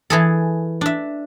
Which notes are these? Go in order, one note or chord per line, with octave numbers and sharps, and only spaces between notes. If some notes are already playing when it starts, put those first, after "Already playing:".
E3 G#4 A4
D4 E5